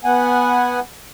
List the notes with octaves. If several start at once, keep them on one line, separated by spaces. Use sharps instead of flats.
B3 F#5 G#5